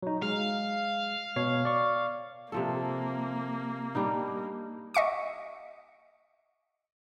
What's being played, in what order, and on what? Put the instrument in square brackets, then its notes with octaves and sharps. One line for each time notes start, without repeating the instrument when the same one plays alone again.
[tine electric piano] F#3 D#4
[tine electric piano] G#3 [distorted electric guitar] F5
[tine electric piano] B2 C#5 C7
D5 C#6
[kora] C3 F3 A4 [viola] A#3
[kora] G3 D4 D#4
[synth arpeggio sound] D#5 E5 C#6 D6